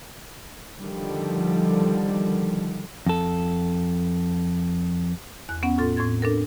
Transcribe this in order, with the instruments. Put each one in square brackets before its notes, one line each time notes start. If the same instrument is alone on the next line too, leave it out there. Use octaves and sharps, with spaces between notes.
[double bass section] D3 D#3 F3 G3
[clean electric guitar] F2 A4
[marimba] E2 F#6
B3 C#4 F#5
A2 F4 A4 C6 A6
A2 C4 C6 G#6 A6
D4 A4 A#4